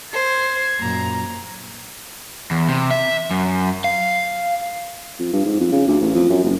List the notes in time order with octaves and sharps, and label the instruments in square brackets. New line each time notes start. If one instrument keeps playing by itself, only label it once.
[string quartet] C5 [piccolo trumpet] G#6
[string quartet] F#2 A#2 A#5
[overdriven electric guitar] E2
C3
E5
F#2
F5
[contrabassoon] F2
G2
G#2
F2
C#3
D2
A1
F2
F#2
F#1